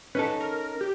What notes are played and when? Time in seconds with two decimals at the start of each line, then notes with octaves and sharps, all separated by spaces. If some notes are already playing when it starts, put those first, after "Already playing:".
0.15 C#4 D#4 A4 B4
0.41 A#4
0.81 G4